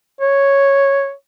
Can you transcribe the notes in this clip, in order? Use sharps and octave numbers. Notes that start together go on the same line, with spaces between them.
C#5